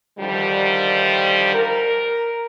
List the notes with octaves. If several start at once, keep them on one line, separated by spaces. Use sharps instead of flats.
D3 D#3 F3 G3
A#4